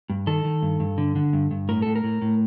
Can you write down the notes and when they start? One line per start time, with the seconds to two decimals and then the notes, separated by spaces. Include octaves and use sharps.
0.10 G2
0.27 D#3 A4
0.45 D#3
0.62 G2
0.80 G2
0.98 D3
1.16 D3
1.33 G2
1.51 G2
1.69 A2 A#4
1.82 A2 A4
1.95 A#4
2.04 A2
2.22 A2